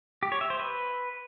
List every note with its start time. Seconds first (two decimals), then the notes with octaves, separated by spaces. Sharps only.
0.23 G4
0.32 C#5
0.41 E5
0.50 C5
0.59 B4